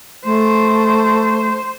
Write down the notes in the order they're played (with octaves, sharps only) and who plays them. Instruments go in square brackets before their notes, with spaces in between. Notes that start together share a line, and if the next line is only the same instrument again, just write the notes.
[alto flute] A3 [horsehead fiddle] C5